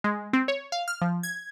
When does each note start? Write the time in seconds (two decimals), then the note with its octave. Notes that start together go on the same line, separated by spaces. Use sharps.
0.04 G#3
0.33 C4
0.48 C#5
0.72 F5
0.88 F6
1.02 F3
1.23 G#6